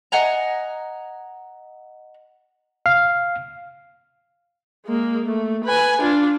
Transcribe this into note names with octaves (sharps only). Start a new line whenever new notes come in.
D#5 F#5 G#5 A#5
F5
G#3 A#3
A3
B4 G#5
D4 F4